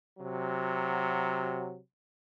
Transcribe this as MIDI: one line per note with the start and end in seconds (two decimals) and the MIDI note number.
0.19 1.78 48
0.19 1.78 54